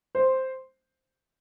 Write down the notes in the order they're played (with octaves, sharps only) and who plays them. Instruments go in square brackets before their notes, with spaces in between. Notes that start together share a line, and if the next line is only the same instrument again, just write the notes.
[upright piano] C5